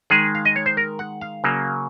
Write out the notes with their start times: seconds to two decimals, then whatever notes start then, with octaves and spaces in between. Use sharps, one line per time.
0.10 D#3 G#3 G#4
0.35 F5
0.45 D#5
0.56 C#5
0.66 C5
0.77 A#4
0.99 F#5
1.21 F5
1.44 C#3 F#3 A#3